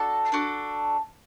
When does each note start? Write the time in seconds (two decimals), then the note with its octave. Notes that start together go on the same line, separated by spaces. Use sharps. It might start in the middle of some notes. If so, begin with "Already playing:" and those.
Already playing: D4 F#4 A4 A5
0.32 D4 F#4 A4